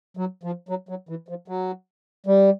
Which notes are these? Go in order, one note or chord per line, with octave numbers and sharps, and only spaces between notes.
F#3
F3
F#3
F#3
E3
F3
F#3
G3